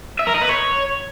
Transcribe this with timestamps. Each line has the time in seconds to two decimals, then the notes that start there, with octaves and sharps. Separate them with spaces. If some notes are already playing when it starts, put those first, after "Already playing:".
0.19 E5
0.27 A#4
0.34 D#5
0.42 B4
0.49 C#5